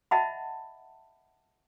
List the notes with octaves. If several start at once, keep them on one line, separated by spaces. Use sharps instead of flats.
D#5 E5 F#5 A5 B5